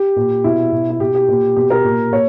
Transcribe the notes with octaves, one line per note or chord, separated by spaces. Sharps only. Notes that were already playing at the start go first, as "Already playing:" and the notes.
Already playing: G4
A#2
B2 E4
B2
E4
B2 G4
G4
A#2
B2 G4
A#4
A#2
A#2 C#5